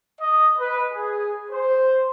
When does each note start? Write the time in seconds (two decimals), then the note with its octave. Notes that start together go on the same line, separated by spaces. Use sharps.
0.19 D#5
0.58 B4
0.92 G#4
1.50 C5